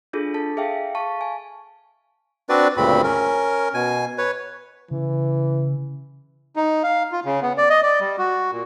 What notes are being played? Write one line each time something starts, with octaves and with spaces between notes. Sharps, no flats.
D4 F4 G#4 A4
A4 A5
G#4 E5 F5 G5
F5 A5 C#6
G#5
C4 D4 F#4 B4 D5
D2 G2 A#2 C#3 C4 B5
C#4 A#4
B2 G#5
B4 C#5
C#3 E3
D#4
F5
F4
C#3
B3
D5
D#5
D5
G3
F#4
A#2